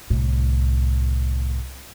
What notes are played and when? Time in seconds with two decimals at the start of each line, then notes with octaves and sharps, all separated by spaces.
0.10 C2 A2